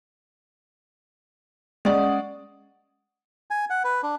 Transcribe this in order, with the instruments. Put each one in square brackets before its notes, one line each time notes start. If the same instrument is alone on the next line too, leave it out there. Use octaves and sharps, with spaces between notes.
[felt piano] G#3 D5 [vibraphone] C#4 F#5 D#6
[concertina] G#5
F#5
B4
D4